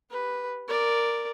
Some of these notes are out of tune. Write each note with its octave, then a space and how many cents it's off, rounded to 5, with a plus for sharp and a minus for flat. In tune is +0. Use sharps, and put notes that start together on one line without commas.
G4 +0 B4 +0
A#4 +0 D5 +0